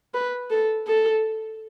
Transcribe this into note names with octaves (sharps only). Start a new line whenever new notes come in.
B4
A4
A4